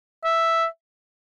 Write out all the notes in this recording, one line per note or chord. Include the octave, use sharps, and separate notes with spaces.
E5